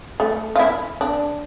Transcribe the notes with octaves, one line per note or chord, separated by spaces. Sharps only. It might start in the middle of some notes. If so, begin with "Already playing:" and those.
A3
F4
E4
D4